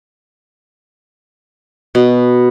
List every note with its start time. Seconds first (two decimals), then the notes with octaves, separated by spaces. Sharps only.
1.95 B2